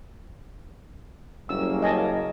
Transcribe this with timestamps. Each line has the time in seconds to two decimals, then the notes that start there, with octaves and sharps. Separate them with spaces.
1.49 F#1 G3 A#3 C#4 E6
1.82 D#5 G#5 A5